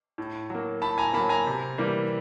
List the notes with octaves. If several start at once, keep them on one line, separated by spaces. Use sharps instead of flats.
A2
F#3 A#3
A2 A5 B5
G#5 A#5
F#3 A#3 A5 B5
G#5 A#5
C3
E3 G3 A#3